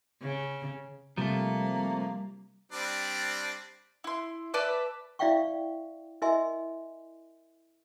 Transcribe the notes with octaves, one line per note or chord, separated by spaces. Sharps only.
C#3
C3 F3 G3 A3 A#3
G3 C4 D4
E4 C6
B4 D5 E5 A5
E4 D5 E5 F5 G5 C#6
E4 A#4 D#5 E5 G#5 C6